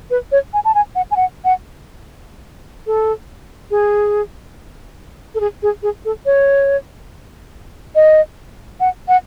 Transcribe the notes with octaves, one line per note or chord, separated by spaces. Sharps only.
B4
C#5
G#5
A5
G#5
F#5
G#5
F#5
F#5
A4
G#4
A4
G#4
G#4
G#4
A4
C#5
D#5
F#5
F#5